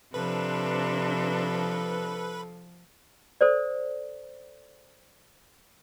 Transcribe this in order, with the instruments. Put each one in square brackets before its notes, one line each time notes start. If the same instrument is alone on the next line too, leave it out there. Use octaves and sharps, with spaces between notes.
[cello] C3 D4 [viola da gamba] F3 [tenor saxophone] A4 [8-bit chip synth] B4
[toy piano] A4 C5 D5